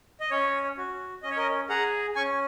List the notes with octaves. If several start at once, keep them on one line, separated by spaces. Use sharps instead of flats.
D#5
C#4 C#5
F#4
C#4 D#5
C#5
A#4 D#5
G#4 F#5 A#5
C#4 G#5 C#6